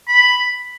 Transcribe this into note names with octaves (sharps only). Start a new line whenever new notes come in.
B5